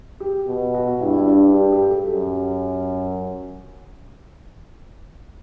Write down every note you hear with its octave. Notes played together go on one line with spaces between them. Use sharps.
G4
B2
F#4
G2 E4
E4
D4
G4
G4
A4
F#2 G4